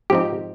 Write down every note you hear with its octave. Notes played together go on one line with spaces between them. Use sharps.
G#2 F3 C4 D#4 G4